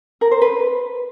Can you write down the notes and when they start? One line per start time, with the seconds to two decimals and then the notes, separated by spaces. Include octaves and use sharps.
0.21 A#4
0.31 C5
0.42 B4